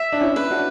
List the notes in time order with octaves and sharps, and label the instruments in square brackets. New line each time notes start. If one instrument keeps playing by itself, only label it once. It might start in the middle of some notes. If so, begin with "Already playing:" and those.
Already playing: [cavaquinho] E5
[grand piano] D4
C#4 E4
[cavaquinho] B4
[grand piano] D4 F#4